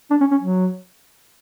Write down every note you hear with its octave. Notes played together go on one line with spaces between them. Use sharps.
D4
C#4
C#4
F#3